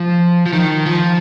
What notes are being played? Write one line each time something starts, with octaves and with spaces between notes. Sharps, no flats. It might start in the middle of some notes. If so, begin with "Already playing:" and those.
Already playing: F3
F3
D#3
F3